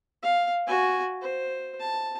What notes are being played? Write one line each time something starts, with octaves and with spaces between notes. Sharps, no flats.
F5
F#4 G#5
C5
A5